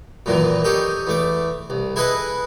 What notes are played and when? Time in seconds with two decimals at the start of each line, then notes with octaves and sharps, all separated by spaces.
0.26 F#2 A#2 D#3 E3
0.64 C#4 D#4 G4 A4
1.07 E2 A3 D6
1.70 C2
1.96 E4 G#4 A4 B4 D#5